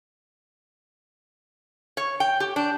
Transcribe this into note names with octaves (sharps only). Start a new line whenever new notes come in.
C#5
G5
G4
D4